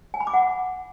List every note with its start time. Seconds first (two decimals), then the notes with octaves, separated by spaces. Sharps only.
0.14 G#5
0.20 B5
0.27 D6
0.34 F#5